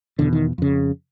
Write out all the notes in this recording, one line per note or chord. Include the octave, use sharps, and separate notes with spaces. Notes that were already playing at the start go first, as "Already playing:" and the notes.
E2 B2 D3
D#3
F2 C#3